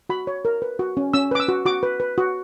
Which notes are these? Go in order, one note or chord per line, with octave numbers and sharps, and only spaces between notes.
F#4 B5
C#5
A#4
B4
F#4
C#4
C#4 E6
B4 D6
E6
F#4
F#4 D6
B4
B4
F#4